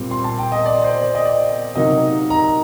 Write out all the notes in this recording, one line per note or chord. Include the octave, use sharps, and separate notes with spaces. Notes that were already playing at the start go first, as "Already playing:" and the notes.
Already playing: A#2 G3 C4
C6
A5
G5
D#5
D5
C5
D5
D#5
D5
C3 F#3 A#3 D#4 D#5
A#5